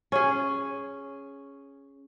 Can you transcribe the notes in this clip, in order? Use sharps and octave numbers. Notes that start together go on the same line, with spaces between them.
C#4 G#4